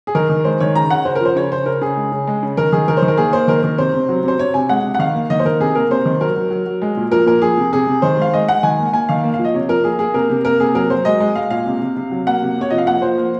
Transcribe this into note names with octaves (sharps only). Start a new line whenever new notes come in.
G#4
D#3 A#4
D#3
G#3 C5
D#3 C#5
C#3 A#5
C#3 F#5
C#3 C5
F3 A#4
C5
C#3 C#5
C#3 C5
C#3 A#4
C#3 G#4
G#3
C#3
G#3
C#3
D#3 A#4
D#3 G#4
D#3 A#4
C5
D#3
A#4
A#3 G#4
A#3 C5
D#3 A#4
D#3 A#4
C3 C5
C3
F#3
C3 C5
C3 C#5
C3 G#5
G#3 F#5
C3
F#5
D#3 F5
A#3
D#3 D#5
C5
D#3 A#4
C3 G#4
A#3 A#4
C3 C5
D#3
F#3 A#4
F#3
F#3
F#3
G#3
A#2
F3 A#4
A#2 A#4
F3 G#4
C3
C3 G#4
C3
D#3 C5
G#3 F5
G#3 D#5
G#3 F#5
D#3 G#5
A#3
A#3 G#5
D#3 F5
A#3
F5
F3
D#5
C3 C#5
F3 A#4
A#3 G#4
A#3 G#4
C3 A#4
C3
A#3 A#4
C3 G#4
F#3 A#4
F#3 C5
G#3 D#5
G#3
G#3 F5
A#2 F5
C3
C3
C3
F#3
A#3 F#5
C3
C3 C#5
F3 D#5
F5
A#3 F#5
F3 C5
A#3